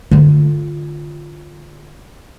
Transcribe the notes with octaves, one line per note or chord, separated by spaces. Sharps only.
D3 F4